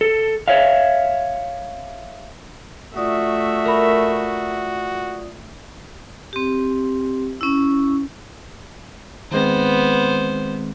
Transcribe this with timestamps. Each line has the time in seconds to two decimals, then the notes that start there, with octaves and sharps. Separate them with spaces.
0.01 A4
0.48 C#5 E5 F5
2.96 A3 F4 F#4 D5 E5 D#6
3.65 A#4 B5
6.33 C4 G4
7.41 C#4 E4
9.32 D#3 G#3 B3 C4 C5